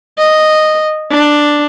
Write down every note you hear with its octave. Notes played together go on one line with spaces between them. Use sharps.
D#5
D4